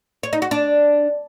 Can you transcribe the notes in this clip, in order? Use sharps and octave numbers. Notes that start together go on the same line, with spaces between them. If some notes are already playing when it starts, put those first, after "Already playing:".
C#5
D#4
F#4
D4